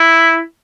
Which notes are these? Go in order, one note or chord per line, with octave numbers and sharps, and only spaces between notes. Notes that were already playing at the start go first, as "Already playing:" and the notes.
Already playing: E4